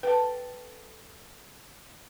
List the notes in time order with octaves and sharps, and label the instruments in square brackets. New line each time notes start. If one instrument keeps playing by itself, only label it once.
[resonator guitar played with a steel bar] A4 G5 [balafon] B4